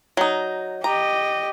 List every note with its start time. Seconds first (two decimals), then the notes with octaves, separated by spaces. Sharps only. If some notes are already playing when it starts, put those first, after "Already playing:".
0.17 F#3 D#4
0.84 G4 D#5 A#5